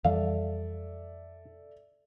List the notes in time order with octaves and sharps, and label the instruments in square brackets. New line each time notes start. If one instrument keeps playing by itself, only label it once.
[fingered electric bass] F2 E3 G3 [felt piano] A4 D5 E5 [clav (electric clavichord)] F5